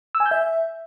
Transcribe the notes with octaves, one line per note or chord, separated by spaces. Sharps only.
E6
G#5
G6
E5